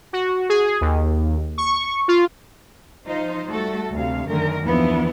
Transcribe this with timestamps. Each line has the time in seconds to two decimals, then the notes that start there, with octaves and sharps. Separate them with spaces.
0.13 F#4
0.49 G#4
0.81 D#2
1.58 C#6
2.08 F4
3.06 F3 D#4 F4 C5
3.46 G3 A3 F#4 A4
3.92 D2 C3 F5
4.28 F#2 D3 D#3 A3 A#4
4.62 D#2 D3 E3 F3 B3 E4